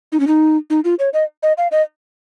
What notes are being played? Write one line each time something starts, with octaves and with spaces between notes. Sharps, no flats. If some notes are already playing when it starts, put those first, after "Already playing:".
D#4
C#4
D#4
D#4
F4
C#5
D#5
D#5
F5
D#5